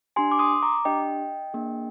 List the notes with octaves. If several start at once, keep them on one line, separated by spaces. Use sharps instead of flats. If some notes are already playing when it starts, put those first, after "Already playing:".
D4 G4 G#5 C6
D6
C6 D#6
A#5 D6
D4 G4 D#5 G5
A#3 D4 G#4